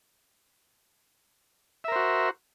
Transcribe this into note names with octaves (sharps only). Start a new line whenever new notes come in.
F#4 A#4 C5 E5